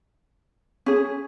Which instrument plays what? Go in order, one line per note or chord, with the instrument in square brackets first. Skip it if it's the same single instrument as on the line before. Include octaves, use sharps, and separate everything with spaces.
[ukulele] C#4 G#4